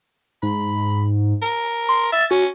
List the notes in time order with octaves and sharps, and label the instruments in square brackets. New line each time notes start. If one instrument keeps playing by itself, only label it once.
[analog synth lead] G#2 [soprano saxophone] B5
[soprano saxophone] A#4
[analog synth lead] C6
[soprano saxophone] E5 [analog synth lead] A6
[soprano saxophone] C#4 [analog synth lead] F#4